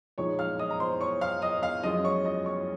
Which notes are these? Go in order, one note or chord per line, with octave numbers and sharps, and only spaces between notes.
A#2 F3 G#3 D#4 C#5 C#6
F5 F6
D#5 D#6
A#5
C5 C6
C#5 C#6
F5 F6
D#5 D#6
F5 F6
F#2 F3 G#3 C#4 F4 D#5 D#6
C#5 C#6
D#5 D#6
C#5 C#6